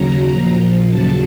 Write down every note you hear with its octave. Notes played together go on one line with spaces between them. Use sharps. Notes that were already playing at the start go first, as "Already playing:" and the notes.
Already playing: D#2 C#3 F#3 A#5
A#2 F3
D#2 C#3 F#3 A5